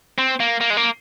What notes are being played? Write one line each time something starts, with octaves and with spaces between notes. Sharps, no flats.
C4
A#3
A#3
G#3
A#3